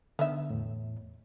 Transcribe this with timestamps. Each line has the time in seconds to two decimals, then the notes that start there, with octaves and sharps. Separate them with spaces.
0.19 D3 B3 D#4 E5
0.50 E2 A2